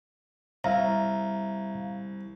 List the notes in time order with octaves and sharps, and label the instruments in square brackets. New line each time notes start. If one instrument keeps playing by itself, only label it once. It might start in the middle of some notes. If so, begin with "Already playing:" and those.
[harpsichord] C2 [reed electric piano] E5 F5 A#5